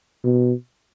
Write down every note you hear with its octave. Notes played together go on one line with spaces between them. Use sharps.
B2